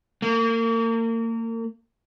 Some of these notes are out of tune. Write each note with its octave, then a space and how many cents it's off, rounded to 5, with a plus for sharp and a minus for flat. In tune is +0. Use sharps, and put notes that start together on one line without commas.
A#3 -35